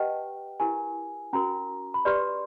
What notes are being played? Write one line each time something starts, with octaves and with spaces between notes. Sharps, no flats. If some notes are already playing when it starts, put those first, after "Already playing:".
Already playing: G4 B4 D#5 F#5 G5 A5
E4 G4 A#4 G#5
C#4 F#4 A#4 A#5
B5
G4 B4 D5 C6